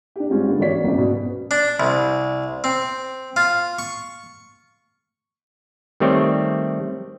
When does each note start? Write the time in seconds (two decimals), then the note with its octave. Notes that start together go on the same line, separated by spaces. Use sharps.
0.16 D4 G4
0.30 G2 G#3 C4 C#4 F4 G4
0.46 D3 G#3 B3 F4 G4
0.59 A1 A#3 F#4 C#5 D5 B6
0.84 F#1 C#2 F#3 C4 D5
0.95 B2 B3
1.51 D4
1.80 C2
2.64 C4
3.36 F4
3.79 C#6
6.00 D#3 G3 A3 C4 C#5 D5